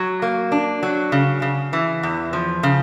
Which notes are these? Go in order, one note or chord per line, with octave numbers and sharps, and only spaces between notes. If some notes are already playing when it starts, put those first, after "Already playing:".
Already playing: F#3
A#3
D4
F#3
C#3
C#3
E3
E2
F3
C#3